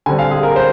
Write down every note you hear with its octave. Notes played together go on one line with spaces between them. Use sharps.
D3 G3 C4 G#5
F5
G#4
A#4
C5